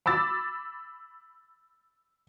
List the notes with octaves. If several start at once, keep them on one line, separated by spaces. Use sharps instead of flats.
B5 D6 E6 A6